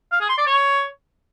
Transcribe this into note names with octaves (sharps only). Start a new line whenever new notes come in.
F5
G#4
C6
D5
C#5